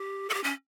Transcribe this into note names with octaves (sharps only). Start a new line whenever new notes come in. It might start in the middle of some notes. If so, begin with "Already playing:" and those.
Already playing: G4
A4
G4
C#4